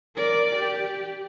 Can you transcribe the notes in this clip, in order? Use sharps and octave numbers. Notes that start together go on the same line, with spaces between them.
A#4 D5
G4